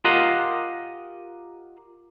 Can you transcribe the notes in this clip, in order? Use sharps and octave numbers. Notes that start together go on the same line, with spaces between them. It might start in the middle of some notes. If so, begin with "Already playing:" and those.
F4 G4 A#4 D#5 F5 F#5